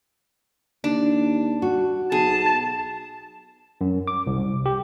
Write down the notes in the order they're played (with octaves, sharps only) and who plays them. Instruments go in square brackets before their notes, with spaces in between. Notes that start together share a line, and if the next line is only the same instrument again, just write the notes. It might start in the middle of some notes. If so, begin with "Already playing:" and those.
[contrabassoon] D#2 [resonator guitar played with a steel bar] D4
[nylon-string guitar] F#4
[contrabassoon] B1 [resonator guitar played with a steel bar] G#4 [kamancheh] A5
[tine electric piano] F#2
D6
C2
G4